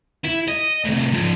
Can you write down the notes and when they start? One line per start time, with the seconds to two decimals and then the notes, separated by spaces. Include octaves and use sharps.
0.24 E4
0.48 D#5
0.84 A2 C3
1.12 G#2 F3